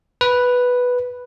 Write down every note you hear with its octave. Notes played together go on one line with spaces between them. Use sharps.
B4